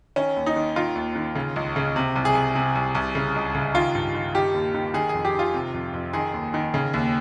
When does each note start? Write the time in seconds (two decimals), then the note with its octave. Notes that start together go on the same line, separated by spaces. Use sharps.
0.16 D#3 C#4
0.36 D#2
0.46 D#4
0.56 D#3
0.76 D#3 F4
0.95 D#2
1.15 D#3
1.35 C#3
1.56 C#2
1.76 C#3
1.96 C3
2.16 C2
2.25 G#4
2.35 C2
2.55 C3
2.75 C2
2.95 C2
3.15 C#3
3.35 C#2
3.55 C#3
3.74 D#3 F4
3.95 G2
4.15 D#3
4.35 D#3 G4
4.54 D#2
4.74 D#3
4.94 D#3 G#4
5.09 F2 G#4
5.25 G4
5.34 D#3 F4
5.54 C3
5.74 F2
5.94 F2
6.13 D#3 G#4
6.34 D#2
6.54 D#3
6.74 C#3
6.94 D#2